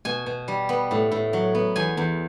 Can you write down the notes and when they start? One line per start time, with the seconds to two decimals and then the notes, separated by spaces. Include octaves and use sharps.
0.05 B2 G#5
0.26 B2
0.48 G3
0.69 B3
0.91 A2
1.12 A2
1.33 F#3
1.55 B3
1.76 E2 G#5
1.97 E2